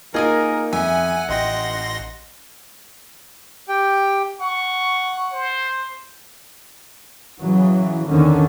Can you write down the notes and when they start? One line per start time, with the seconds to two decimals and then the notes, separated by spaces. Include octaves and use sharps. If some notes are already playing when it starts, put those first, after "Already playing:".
0.14 A#3 D#4 F4 G#4 A#4 D#5 G#5
0.73 F2 E5 F#5 G#5
1.29 A1 D#5 G5 C6 A#6
3.68 G4 G5
4.40 F#5 C#6
5.33 C5
7.40 C#3 E3 F#3
8.10 E2 D3 D#3 C#4